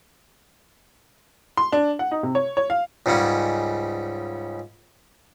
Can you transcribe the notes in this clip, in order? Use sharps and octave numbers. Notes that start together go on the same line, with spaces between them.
C6
D4
F#5
D#4
C3
C#5
C#5
F5
C#2 G#2 C#3 G3 C#4